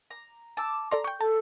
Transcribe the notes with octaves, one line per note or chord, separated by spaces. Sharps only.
A#5
A5 D6 E6
A4 D5 A#5 C6
G5 C#6 G6
A4 A5